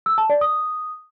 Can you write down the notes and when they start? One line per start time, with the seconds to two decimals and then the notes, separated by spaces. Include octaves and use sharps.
0.06 E6
0.18 A5
0.30 D5
0.41 D#6